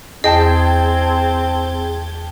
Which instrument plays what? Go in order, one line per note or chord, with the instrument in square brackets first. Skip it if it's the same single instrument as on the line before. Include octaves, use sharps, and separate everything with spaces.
[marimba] E2 [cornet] C4 [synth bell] G#4 G5 A5 [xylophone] D#5